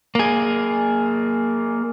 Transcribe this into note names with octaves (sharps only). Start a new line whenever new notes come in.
A#3 G#4